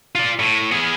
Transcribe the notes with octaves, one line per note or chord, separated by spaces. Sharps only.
F4 D5
A2
B3 G#4